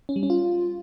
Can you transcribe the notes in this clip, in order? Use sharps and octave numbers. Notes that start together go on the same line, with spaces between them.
C#4
G3
C#4
F4